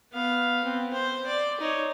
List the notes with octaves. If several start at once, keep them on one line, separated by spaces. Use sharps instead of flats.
B3 F5
B3 C4
C5
D5 D6
D#4 C#5